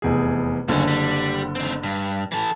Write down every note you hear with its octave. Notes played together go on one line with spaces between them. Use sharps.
F1 E2 G#4
F#1 G2 D3 C#4
G3
C4 D#4
G2
E3 A4